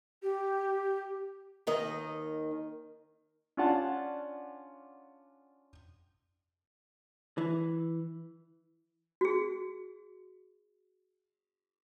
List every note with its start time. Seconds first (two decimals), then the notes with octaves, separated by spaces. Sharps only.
0.22 G4
1.67 D#2 D#3 D#5
3.57 C#4 D4 F4 D5 F#5 A5
7.38 E3
9.21 F#4 G#4